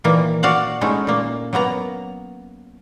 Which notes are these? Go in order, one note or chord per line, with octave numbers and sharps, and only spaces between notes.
A#2 D#3 E3 A#3
F#4 D5 F5 F#5
G#3 A3 C#4 D#4 E4
A#2 A#3
F#3 A#3 B3 A#5